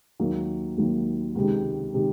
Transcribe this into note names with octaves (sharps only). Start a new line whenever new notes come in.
D#2 D#3 F#3 A#3
D#2 D#3 F#3 A#3
C#2 C3 D#3
C3 D#3